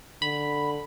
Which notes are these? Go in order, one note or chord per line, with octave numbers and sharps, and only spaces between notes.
D3 B5